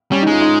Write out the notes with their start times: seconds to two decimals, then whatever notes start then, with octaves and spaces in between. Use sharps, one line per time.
0.12 G3 C#4
0.22 D#4
0.27 G#3 F4
0.41 D#4